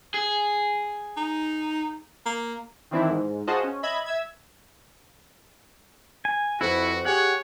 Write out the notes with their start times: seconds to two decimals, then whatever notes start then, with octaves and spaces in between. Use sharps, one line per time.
0.14 G#4
1.17 D#4
2.26 A#3
2.91 D#3 E3 C4 D4 E4
3.10 G#2
3.47 F4 F#4 G#4 C5 D#5 A5
3.63 C#4
3.83 D#5 E5 B5 G#6
4.06 E5 E6 G#6
6.25 G#5
6.61 F2 E4 F#4 B4
7.05 G4 G#4 C#5 F#5